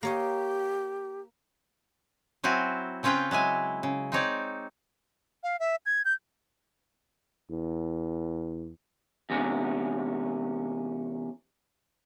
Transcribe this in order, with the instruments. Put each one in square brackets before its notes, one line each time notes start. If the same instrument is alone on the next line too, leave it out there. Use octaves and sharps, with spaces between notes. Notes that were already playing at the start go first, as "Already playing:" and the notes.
[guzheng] A#3 C#5 D#5 [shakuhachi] G4
[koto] F#3 C4 E4 F#4 G#5
C#3 C4 C#4 F4 B4 G5
F#3 G#3 E4 G#5
C#3
C4 D#4 C#5 D5
[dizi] F5
E5
G#6
G6
[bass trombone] E2
[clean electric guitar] E2 C3 C#4